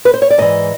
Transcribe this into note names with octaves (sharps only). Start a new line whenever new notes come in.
B4
C5
C#5
D5
G#2 E3 D#5